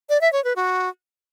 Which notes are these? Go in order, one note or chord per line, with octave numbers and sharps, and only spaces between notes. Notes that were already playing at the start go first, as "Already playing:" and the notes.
D5
E5
C#5
B4
F#4